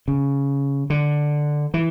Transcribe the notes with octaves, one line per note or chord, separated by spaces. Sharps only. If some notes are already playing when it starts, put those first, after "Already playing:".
C#3
D3
E3